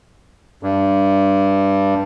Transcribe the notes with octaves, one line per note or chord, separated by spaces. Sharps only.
G2